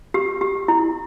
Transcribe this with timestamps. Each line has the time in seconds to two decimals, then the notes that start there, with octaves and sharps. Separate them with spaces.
0.14 G4
0.41 G4
0.68 E4